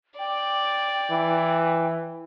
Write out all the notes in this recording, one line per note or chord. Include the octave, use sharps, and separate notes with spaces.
D5 G5
E3